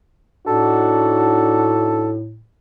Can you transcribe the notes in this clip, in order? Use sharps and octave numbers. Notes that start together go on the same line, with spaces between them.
A2 D4 D#4 F#4 A4